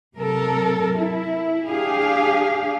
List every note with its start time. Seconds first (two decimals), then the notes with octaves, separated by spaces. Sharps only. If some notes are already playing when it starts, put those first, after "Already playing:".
0.18 C3 F#3 A4 A#4
0.96 E4
1.69 D4 G4 G#4 F5